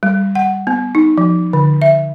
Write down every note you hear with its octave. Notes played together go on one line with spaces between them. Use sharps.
G3
F#5
B3
D#4
F3
D3
E5